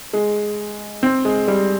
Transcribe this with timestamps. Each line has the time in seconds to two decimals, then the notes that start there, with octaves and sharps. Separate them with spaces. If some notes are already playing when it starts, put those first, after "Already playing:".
0.13 G#3
1.03 C4
1.25 G#3
1.48 G3